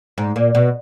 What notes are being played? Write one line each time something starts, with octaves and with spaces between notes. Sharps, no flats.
G#2
A#2
B2